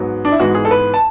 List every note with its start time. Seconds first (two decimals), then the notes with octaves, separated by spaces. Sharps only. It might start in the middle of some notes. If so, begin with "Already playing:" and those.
Already playing: G#2 F#3 B3
0.25 D4
0.32 E4
0.40 G#2 E3 G#3 B3 F#4
0.55 G#4
0.65 A4
0.71 B4
0.94 A5